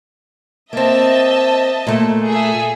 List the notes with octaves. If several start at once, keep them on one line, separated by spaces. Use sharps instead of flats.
A#3 C4 D#5 E5 A5
A#2 A3
G#4 A4 E5